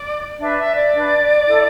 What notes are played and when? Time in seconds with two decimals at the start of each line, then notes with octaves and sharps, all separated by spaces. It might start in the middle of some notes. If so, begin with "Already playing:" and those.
Already playing: D5
0.39 D4 B4 E5
0.57 E5
0.75 D5
0.94 D4 B4
1.47 E4 A4